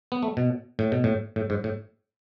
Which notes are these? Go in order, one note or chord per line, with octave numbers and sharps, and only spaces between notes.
B3
A3
B2
A2
B2
A2
A2
G#2
A2